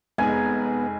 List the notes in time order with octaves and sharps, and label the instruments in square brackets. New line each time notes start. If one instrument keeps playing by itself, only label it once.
[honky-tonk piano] F1 G#4 [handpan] G#3 D#4 [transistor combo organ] B3 [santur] G#5